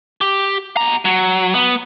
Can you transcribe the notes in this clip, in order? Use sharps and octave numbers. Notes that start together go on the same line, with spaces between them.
G4
B2 A#5
F#3
B3